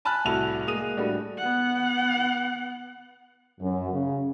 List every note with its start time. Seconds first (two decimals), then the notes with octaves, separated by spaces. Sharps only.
0.05 G#5 A5 B5 F6 F#6
0.25 C2 A2 E4 F#4 F7
0.67 G#3 A#3 D#6 D#7 F7
0.97 A2 G3 D4 F#4
1.38 B3 F#5
3.61 F#2
3.92 C#3